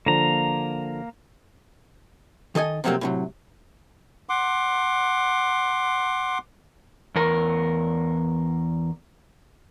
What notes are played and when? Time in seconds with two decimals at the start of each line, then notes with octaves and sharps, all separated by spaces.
0.06 D3 F3 A#3 A#5
2.55 D#3 A4 D#5 G#5
2.84 C3 F3 F#3 A3 A#3 C4
3.01 A2 C3 F#3
4.29 F#5 C6 D6
7.15 E2 A#4